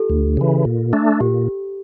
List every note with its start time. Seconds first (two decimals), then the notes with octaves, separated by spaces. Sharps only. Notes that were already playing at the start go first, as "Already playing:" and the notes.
Already playing: F4 G4 A4
0.09 D2
0.37 C#3 E3
0.65 A#2
0.93 A3 D4
1.20 A#2 G4